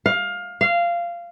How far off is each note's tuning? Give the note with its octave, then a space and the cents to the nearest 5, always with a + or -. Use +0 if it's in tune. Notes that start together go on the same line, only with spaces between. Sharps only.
F5 +20
F5 -15